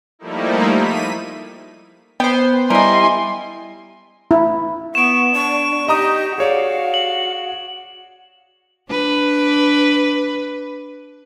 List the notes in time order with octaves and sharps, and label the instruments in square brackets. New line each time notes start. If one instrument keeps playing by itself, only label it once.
[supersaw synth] F3 G3 A3 A#3 D#4 E4
B6 D#7
[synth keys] B3 C5 [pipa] G5
[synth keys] G3 [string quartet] E4 G#5 [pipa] A#4 D#5 [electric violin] C6
[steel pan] E4
[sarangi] B3 [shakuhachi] C#6 [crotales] D7 E7
[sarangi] D4 [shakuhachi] C#6
[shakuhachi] D#4 [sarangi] G4 [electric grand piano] D#5 A#5 D#6
[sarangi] F#4 [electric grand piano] G#4 C#5 D5 [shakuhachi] F5
[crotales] F#7
[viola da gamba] D4 B4